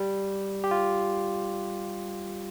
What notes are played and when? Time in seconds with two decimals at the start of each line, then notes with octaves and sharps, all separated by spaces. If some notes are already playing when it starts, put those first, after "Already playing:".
Already playing: G3
0.64 G4
0.71 F4